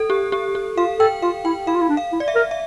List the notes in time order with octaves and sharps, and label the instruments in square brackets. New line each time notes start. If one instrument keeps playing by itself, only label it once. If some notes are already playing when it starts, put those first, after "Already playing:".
Already playing: [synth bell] A4
G4
G4
G4
[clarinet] F4 [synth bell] F5
[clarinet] A4 [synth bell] G5
[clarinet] F4 [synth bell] F5
[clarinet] E4 [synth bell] G5
[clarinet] E4 [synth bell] F5
[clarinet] F4
E4
D4
[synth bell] F5
[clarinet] E4
[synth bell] D5
E5
[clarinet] A#4
[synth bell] E5